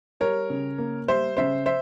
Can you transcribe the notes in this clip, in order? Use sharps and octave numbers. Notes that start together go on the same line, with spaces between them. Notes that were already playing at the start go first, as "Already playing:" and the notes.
G3 A#4 C#5
C#3
A#3
G3 C5 E5
C#3 C5 E5
C5 E5